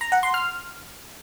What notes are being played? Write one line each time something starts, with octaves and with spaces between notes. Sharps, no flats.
A#5
F#5
C6
F6